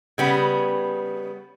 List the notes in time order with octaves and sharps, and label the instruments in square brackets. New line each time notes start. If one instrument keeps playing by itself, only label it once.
[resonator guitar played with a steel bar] C#3 G3 B3